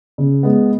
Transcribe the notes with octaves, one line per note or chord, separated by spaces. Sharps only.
C#3
G#3 B3